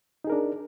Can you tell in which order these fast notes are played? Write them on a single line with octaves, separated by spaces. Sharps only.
D#4 G#4 A#4 D4